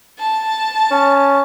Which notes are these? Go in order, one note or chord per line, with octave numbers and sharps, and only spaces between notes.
A5
C#4